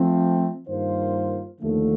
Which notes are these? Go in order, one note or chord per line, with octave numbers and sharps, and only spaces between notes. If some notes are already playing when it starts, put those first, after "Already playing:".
Already playing: F3 A3 C4
G2 D#3 A#3 F4 C5
D#2 D3 F3 A3